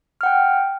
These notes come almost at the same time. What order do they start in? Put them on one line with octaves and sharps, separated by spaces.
F6 F#5 G5